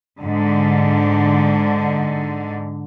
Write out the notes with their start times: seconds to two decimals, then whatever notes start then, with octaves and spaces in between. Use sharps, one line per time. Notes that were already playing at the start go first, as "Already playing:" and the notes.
0.20 G#2 D3